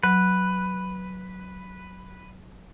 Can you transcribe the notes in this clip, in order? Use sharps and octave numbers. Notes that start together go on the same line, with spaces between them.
F#3 B4